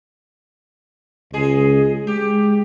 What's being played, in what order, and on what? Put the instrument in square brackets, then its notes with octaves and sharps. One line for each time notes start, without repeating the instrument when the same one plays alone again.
[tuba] C#2 [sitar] G#3 G#4
[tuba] G#3 [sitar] G4